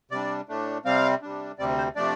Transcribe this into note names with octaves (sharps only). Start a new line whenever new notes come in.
C3 G3 D4 D5
A2 A3 D4
C3 G3 C4 F5
C3 G3 D4
D2 C3 G3 C4 D5
C5
C3 F3 A3 D4 D5